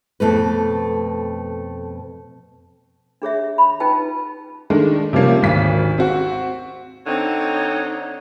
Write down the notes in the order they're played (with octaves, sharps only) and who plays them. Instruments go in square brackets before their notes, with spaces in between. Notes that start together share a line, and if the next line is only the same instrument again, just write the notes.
[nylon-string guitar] F2 B2 A3 B4
[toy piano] D4 G#4 C#5 E5
B5
C#4 D#4 F4 B4 G5 A5
[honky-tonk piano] D#3 G#3 A3 D4
C3 F3 G3 A#3 C#4
G#1 D2 B6
C4 F#4
[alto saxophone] D3 [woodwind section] C4 C#5 [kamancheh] D#4